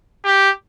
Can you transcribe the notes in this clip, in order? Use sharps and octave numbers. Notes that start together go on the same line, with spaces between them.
G4